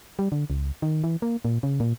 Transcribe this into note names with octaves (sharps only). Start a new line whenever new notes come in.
G3
D3
C#2
D#3
E3
A#3
A#2
C#3
A#2